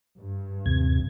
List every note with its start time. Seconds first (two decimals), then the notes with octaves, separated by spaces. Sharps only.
0.17 G2
0.66 D#2 C3 G#6